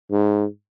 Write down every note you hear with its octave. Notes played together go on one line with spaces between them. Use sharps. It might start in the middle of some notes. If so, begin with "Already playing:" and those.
G#2